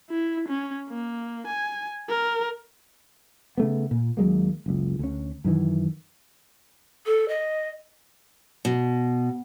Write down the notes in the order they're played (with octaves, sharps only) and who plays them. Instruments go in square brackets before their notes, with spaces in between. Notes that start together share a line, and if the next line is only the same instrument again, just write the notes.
[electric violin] E4
C#4
A#3
G#5
A#4
[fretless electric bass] C#3 A3 B3
A#2
D#2 F#3 G#3 A#3
F#1 C#2
D2 C#4
F#2 D#3 E3
[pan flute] A4
D#5
[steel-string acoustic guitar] B2